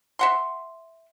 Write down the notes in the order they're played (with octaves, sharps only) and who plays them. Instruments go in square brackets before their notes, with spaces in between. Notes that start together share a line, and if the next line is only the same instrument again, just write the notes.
[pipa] E5 F#5 C6